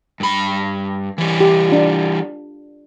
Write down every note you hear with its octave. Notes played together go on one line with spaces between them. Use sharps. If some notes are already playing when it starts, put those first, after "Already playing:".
G2 B5
E3 G3
G4
D4 F4